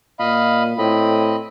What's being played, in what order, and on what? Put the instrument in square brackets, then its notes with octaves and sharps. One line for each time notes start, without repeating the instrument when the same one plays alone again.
[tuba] A#2 [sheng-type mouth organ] D#5 F5 B5
[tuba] A2 [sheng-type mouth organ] C4 D#5 B5